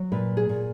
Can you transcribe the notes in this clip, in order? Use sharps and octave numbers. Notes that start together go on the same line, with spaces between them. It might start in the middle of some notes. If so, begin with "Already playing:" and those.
Already playing: F#3
A#2 B4
G#4
A#2